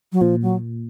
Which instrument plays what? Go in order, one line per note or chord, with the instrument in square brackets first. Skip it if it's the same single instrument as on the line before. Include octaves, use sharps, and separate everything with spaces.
[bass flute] F#3
[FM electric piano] A#2 [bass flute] F3
[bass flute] F#3